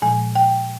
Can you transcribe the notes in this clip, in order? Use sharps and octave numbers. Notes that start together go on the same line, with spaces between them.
A#2 F3 G#3 G#5
G5